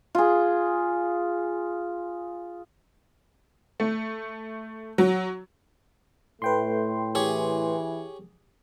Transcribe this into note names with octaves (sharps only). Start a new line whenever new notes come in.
F4 G#4
A3
F#3
A2 A3 B4 G5 C6
E3 G4 G#4 C#5